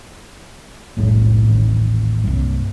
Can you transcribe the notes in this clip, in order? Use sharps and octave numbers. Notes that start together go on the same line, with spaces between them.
F1 B1 A2 G#3
D#1 A1 D#2
C2 G2